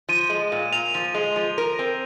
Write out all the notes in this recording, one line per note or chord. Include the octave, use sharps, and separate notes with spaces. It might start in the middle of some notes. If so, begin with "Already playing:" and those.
F3 D#7
G#3
A#2
A#2 F7
F3
G#3
F3
A#4
C4